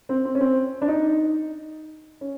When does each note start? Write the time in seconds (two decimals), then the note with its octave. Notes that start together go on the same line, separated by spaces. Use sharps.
0.09 C4
0.25 C4
0.35 C#4
0.41 C4
0.82 D4
0.88 D#4
2.21 C#4